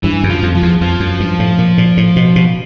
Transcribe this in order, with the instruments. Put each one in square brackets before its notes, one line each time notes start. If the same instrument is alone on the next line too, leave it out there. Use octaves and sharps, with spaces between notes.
[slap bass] G2 [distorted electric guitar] E3
[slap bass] F#2
[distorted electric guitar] F3
[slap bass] F2
[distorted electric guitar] F3
[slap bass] E2
[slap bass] F2 [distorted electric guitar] F3
[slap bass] F#2
G2
A2
A#2
A#2
A2
B2
B2